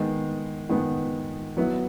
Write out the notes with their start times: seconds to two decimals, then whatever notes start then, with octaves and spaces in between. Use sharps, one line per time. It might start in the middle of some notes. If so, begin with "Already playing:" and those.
Already playing: D#3 G#3 B3
0.69 D#3 G#3 B3
1.57 F#3 B3 E4